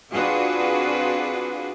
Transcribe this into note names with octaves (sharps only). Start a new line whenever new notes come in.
C4 D4 F4 F#4 G#4 B4